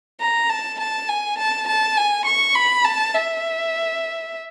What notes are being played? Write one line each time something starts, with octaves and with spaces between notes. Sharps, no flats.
A#5
A5
A5
G#5
A5
A5
G#5
C#6
B5
A5
E5